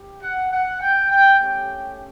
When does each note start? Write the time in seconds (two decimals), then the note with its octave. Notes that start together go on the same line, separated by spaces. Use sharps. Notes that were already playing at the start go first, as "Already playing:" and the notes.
Already playing: G4
0.22 F#5
0.51 F#5
0.81 G5
1.11 G5
1.40 A3 C#4 G4 G5